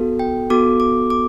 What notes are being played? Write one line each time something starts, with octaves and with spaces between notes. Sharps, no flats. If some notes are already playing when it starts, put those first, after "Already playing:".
Already playing: B3 F#4 A4
G5
B3 F#4 A4 D6
D6
D6